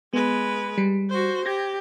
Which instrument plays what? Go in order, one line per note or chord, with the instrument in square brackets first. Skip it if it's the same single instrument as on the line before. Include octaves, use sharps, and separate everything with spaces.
[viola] G#3 B4 [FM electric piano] B3
[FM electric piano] G3
[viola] F#4 C5
[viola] G4 [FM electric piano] G#6 A#6